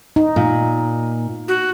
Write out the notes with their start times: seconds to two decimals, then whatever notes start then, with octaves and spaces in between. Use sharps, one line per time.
0.16 D#4
0.36 A#2
1.48 F#4